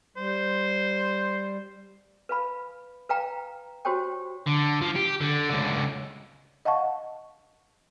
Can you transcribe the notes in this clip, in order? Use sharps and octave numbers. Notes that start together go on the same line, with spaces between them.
G3 C5
B4 F5 B5
B4 F5 G5 A#5
F#4 G4 C5 C#5 G5
D3
F3
G4
D3
C#2 D3
D#5 F5 F#5 A5 C#6